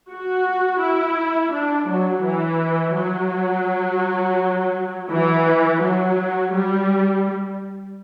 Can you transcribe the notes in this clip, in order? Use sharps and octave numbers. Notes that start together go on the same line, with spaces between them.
F#4
E4
D4
F#3
E3
F#3
E3
F#3
G3